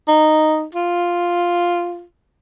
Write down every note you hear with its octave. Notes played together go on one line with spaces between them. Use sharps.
D#4
F4